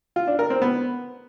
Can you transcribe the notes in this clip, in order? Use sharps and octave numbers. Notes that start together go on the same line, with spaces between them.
F4
D4
A#4
C4
B3